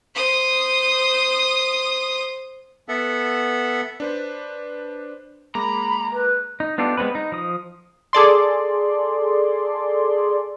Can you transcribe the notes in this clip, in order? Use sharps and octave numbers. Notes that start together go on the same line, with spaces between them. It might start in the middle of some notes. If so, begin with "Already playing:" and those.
C5 D#6
B3 A4 E5 F#5
D4 B4 C5
G#3 A#3 A#5 B5 D6
B4
D#4
B3 D4 F4 G4 A4
G#3 B3 C4 B4
D#4
F3 D#6
G#4 A4 D5 C6